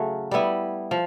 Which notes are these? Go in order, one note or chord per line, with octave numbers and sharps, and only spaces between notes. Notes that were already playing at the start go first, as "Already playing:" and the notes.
Already playing: C#3 F#3 A3
G3 B3 E4
F3